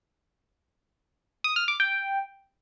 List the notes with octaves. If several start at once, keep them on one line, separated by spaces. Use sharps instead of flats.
D#6
F6
D6
G5